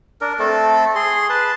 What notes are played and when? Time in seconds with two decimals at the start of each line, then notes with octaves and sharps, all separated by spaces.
0.21 D4 A#4
0.39 A3 C4 A4
0.95 G#4 C6
1.30 B4 A5